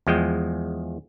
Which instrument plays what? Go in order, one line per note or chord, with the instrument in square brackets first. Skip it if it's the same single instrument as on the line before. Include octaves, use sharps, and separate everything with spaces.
[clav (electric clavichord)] E2 F3 G#3 G5